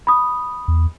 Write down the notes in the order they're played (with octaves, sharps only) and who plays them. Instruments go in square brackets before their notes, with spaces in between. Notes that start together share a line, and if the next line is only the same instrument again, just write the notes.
[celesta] B5 D#6
[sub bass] E2